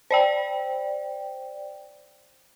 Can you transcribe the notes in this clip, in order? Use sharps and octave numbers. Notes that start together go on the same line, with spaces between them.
C5 D5 G5